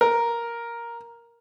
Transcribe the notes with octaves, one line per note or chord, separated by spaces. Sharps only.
A#4